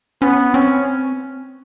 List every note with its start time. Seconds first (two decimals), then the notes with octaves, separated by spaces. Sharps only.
0.22 B3 C#4
0.54 C4 C#4